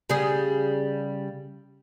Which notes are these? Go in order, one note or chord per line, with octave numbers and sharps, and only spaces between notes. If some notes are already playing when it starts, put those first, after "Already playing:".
C#3 G3 G#4